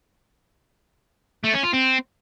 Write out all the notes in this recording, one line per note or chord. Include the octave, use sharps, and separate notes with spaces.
A3
C#4
F4
C4